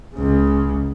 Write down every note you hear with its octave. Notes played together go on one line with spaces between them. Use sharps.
C#2 C#3